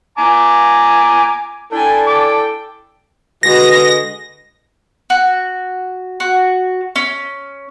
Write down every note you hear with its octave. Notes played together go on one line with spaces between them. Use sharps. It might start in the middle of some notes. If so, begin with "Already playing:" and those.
G#5 A#5 D6
D4 E4 A4 G5 G#5
G5 D6
D3 G#3 F#4 B4 D#5 A#6
F#4
F#4
C#4